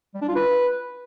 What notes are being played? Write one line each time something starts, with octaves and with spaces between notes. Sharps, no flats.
G3
D4
F4
B4